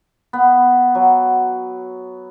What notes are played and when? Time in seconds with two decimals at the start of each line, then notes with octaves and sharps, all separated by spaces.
0.33 B3
0.95 F#3